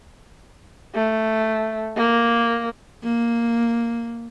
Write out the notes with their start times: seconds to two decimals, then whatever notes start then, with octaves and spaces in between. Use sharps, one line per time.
0.95 A3
1.97 A#3
3.03 A#3